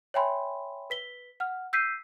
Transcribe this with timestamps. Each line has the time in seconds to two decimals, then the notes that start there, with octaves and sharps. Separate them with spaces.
0.14 C#5 E5 G5 G#5 B5 C6
0.90 B4 B6 G7
1.40 F#5 F6
1.73 E6 G6 B6 C7 D#7